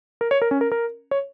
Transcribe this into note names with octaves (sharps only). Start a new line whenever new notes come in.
A#4
C#5
A#4
C#4
A#4
A#4
C#5